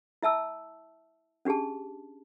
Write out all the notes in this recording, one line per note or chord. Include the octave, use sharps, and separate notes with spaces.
E4 E5 A5 E6
C#4 D4 G4 G#4 A5